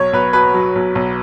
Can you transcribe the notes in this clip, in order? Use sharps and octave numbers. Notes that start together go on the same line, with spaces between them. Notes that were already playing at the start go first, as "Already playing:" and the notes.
Already playing: B1 C#5
B1 B4
B2 B4
F#3
B1
B1